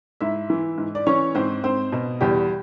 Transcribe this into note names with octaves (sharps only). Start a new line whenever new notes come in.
G#2 E4 E5
E3
G#2
D5
E3 C#4 C#5
G#2 C4 C5
G#2 C4 C5
B2
E2 G3 G4